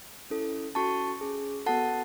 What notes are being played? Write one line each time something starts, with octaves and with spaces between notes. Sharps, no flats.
C#4 E4 A4
C#4 F#4 A4 A5 C#6
C#4 G#4
B3 F#4 A4 F#5 A5